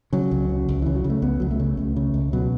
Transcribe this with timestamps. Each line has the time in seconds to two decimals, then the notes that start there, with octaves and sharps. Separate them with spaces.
0.13 C#3 F#3
0.31 C#2
0.49 C#3
0.69 C#2
0.82 C#3 E3
0.95 F#3
1.04 C#3
1.10 A3
1.22 C#2 B3
1.40 C#2 F#3
1.51 A3
1.60 C#3
1.77 C#2
1.96 C#3
2.14 C#2
2.33 B2 F#3